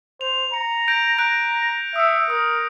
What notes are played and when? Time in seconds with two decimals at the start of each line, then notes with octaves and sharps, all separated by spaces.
0.21 C5 F7
0.53 A#5 C#7
0.88 G6 A#6 D7
1.19 A#5 F#6 D7
1.96 E5 D#6 C#7
2.30 A#4 D#6